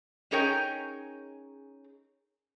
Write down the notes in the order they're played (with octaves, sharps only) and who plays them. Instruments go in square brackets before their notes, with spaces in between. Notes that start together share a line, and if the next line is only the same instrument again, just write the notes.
[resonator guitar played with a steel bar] C#4 D#4 G#4 A#4 C#5 G5